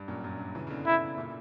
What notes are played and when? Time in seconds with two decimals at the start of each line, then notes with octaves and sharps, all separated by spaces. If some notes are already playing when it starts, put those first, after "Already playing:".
Already playing: G2
0.08 F#2 A#2
0.24 F#2 A#2
0.40 G2
0.55 C#3 E3
0.67 C#3
0.70 B2 D3
0.86 E4
1.18 A#2 C#3